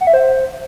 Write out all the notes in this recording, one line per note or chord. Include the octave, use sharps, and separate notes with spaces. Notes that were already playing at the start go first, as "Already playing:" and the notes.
F#5
E5
C5